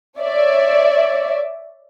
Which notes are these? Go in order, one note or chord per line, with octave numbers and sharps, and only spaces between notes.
C#5 D5 E5